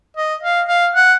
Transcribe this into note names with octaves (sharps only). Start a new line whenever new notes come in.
D#5
F5
F5
F#5